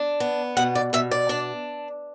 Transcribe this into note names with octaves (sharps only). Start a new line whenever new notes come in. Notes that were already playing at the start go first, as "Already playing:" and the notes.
Already playing: D4
B3
B2 F#5
D5
B2 E5
D5
D4